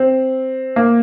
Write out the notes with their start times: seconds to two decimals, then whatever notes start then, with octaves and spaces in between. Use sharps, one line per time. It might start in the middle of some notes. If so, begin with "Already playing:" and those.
Already playing: C4
0.76 A#3